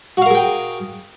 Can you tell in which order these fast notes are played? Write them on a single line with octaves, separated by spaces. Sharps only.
F#4 F5 A#4 G#4 G5